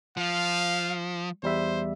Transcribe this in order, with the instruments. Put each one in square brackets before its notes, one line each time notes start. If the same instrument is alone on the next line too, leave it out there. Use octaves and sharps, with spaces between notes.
[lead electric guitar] F3 [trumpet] F5
[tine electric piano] E2 G3 E5 [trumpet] C5